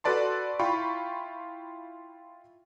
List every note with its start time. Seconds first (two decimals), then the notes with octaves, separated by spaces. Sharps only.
0.04 F#4 A4 B4 D5 A5 C6
0.59 E4 F4 G5 B5 C#6